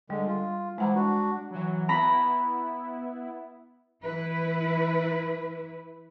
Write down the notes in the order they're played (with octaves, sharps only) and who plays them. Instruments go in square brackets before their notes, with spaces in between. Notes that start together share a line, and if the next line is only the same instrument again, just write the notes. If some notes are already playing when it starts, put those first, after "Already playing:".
[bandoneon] D3 G#3 [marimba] G3
[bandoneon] F4
[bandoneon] E3 F3 E4 [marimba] G#3 F#5 A#5
[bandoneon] D4 F#4
[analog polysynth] E3 F#3
[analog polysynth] B3 E4 [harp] A#5 B5
[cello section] E3 E4 B4